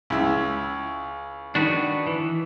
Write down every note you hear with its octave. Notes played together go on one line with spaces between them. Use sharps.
C#2 E4
D#3 D4 F#4 B4
E3